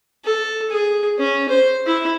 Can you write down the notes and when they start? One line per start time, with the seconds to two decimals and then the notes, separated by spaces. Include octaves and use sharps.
0.25 A4
0.70 G#4
1.19 C#4
1.49 C5
1.86 E4